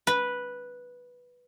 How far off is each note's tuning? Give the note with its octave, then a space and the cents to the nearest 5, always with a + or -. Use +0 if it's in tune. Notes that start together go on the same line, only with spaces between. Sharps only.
B4 -5